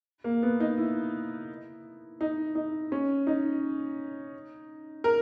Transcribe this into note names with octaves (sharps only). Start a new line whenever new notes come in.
A#3
B3
D#4
E4
D#4
D#4
C#4
D#4
A#4